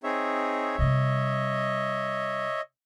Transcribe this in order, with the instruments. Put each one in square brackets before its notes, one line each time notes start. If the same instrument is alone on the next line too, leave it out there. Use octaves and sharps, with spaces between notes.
[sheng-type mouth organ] C4 D#4 G#4 [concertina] C#5 E5
[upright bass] C3 G3 [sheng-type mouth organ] D#5